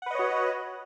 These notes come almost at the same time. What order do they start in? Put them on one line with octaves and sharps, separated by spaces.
F#5 B4 D#5 C#5 F#4